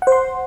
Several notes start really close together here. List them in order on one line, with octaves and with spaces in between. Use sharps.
F#5 C5 C6